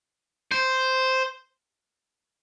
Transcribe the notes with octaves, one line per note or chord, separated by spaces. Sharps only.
C5